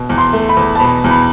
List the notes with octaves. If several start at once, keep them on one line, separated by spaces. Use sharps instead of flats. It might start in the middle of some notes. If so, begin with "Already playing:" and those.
Already playing: B2
E2
C6
A3
B5
E2
A5
B2 B5
E2
B5